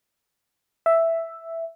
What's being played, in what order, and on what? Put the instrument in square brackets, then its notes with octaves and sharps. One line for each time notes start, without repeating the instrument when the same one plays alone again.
[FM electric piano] E5